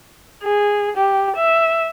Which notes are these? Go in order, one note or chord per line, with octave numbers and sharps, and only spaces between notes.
G#4
G4
E5